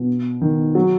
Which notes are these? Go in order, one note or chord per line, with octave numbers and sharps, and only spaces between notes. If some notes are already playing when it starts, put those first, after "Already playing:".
Already playing: B2
D#3
F#3